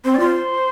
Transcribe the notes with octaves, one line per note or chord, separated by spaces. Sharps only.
C4 C5
D5
F4
C5